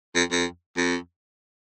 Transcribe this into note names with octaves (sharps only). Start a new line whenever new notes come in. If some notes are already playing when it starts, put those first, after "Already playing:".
F2
F2
F2